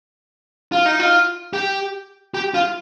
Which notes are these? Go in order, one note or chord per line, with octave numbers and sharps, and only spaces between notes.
F4
D#4
F4
G4
G4
F4